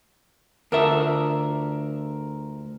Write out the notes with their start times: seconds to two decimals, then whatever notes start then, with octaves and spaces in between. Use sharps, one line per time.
0.72 D2 F4 A4 A#4 E5